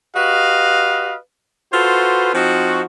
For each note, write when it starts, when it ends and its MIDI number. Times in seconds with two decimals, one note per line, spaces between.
0.16 1.17 66
0.16 1.17 67
0.16 1.17 71
0.16 1.17 75
0.16 1.17 77
1.73 2.32 65
1.73 2.32 66
1.73 2.32 69
1.73 2.32 71
1.73 2.32 72
2.34 2.83 53
2.34 2.83 60
2.34 2.83 63
2.34 2.83 66